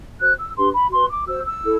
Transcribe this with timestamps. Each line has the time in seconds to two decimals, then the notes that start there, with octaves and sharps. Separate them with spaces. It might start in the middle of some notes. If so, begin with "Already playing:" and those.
0.19 F#4 C5 F#6
0.37 E6
0.55 D4 G4 B4 C6
0.73 B5
0.90 F#4 B4 C6
1.09 D6
1.26 F#4 C5 E6
1.45 E6
1.62 E4 A4